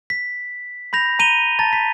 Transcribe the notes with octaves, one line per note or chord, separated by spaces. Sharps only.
B6
B5 G6 A#6 F7
A#5 D#7 F7 G7
A5 A#5 A6
B6